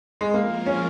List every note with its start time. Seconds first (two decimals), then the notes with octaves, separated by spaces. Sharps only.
0.21 G#3
0.34 F3 G#3 A#3 F4 A#4
0.66 C#4